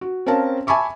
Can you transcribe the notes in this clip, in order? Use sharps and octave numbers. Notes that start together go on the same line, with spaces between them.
F#4
C4 C#4 A#4 F5 A5
E5 G#5 A5 B5 C#6 D6